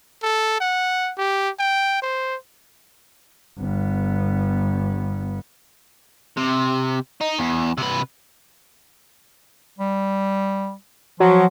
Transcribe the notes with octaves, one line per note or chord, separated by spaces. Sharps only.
A4
F#5
G4
G5
C5
G1 B3
C3
D#4
E2
C3 B4
G3
F3 F#3